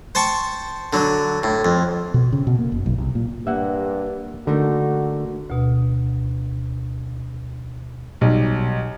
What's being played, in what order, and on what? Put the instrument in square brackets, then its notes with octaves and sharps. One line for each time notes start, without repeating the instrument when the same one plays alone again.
[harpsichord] C5 G5 A5 C#6
D3 F#3
A2
F2
[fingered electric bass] B2
C#3
B2
A#3
F#1
B1
C2
A#2
[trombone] G2 [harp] A#3 [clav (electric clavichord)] E5 F#5
[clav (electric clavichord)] D3 [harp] A3 D#4 A#4 [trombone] F#4
[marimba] D2 B2
[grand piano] B1 G3